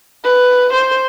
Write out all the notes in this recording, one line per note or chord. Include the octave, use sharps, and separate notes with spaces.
B4
C5